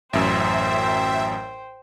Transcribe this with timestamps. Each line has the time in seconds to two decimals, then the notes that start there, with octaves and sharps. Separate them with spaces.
0.13 A1 F#2 C5 E5 G5